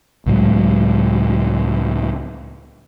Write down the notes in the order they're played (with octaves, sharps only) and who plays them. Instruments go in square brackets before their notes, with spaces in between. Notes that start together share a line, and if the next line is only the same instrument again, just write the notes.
[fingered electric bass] C#2 A2 F#3 G#3